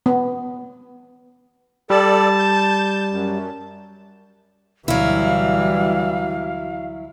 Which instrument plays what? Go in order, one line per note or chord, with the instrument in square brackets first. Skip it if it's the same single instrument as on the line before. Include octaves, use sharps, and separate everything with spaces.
[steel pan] B3
[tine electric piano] G3 [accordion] A4 D5 [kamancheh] A5
[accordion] G6
F#2
[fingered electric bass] D2 B2 D4 [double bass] E3 G3 [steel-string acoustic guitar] F#3 E4 [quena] F5